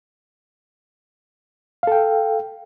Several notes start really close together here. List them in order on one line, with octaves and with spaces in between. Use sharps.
F5 A4 G5